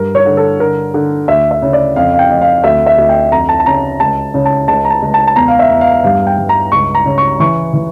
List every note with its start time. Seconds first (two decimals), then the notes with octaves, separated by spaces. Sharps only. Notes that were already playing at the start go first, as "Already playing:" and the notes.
Already playing: G2 A#4
0.15 C#5
0.26 D3
0.37 A4
0.60 D3 A#4
0.94 D3
1.28 D2 E5
1.51 E5
1.62 C#3
1.73 D5
1.96 F2 F5
2.14 F5
2.19 G5
2.30 F2
2.41 F5
2.64 D2 E5
2.86 E5
2.98 D2
3.09 G5
3.32 F2 A#5
3.49 A5
3.60 A5
3.66 C#3 A#5
4.00 C#2 A5
4.34 C#3
4.45 A5
4.68 C#2 A5
4.85 A#5
4.90 A5
5.02 C#2
5.14 A5
5.27 A5
5.36 E2 A#5
5.48 F5
5.59 E5
5.70 E2
5.81 F5
6.04 G2 F5
6.27 G5
6.38 G2
6.49 A#5
6.72 C#2 C#6
6.95 A#5
7.06 C#3
7.18 C#6
7.40 E3 C#6
7.74 E3